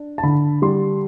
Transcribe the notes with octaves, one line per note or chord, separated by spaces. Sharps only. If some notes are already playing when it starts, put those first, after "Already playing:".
Already playing: D4
A5
D3 B5
G3 C6